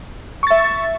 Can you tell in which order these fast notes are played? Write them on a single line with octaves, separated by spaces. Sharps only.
C#6 A6 E5